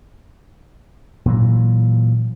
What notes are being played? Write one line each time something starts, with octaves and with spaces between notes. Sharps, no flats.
A#2 E3 F#3